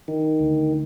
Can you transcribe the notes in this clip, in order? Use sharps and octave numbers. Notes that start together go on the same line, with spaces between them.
D#3
D2